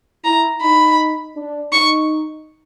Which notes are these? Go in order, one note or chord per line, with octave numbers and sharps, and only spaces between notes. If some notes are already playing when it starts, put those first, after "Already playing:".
E4 A#5
D#4 B5
D4
D#4 C#6